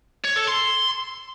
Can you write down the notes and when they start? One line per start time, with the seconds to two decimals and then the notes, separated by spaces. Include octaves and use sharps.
0.24 C#5
0.36 A4
0.48 C6